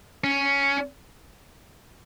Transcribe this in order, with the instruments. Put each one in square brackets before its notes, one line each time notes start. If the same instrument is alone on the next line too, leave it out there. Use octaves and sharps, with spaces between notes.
[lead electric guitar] C#4